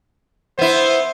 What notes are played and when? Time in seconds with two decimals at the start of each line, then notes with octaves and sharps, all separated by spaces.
0.59 B3 E4 C5